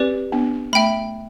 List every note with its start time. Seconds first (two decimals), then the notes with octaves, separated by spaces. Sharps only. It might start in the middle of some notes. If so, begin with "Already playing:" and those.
Already playing: C4 G4 B4 D5
0.32 B3 D4
0.73 A3 E5 G5 B5